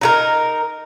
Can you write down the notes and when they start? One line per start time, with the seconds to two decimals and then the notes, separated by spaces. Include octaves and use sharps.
0.01 D#4 E4 A#4